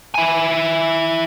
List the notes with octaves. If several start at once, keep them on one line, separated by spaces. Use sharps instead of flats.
E4 G#5